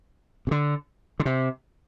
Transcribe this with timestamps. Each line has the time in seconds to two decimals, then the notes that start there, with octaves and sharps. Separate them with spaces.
0.47 C3
0.51 D3
1.20 D3
1.25 C3